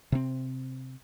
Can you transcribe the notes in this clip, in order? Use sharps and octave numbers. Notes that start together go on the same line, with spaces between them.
C3 C4